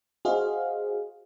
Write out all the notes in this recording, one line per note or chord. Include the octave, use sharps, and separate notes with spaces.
F#4 G#4 C5 D#5 F5